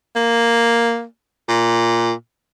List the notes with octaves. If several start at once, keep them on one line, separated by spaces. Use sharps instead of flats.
A#3
A#2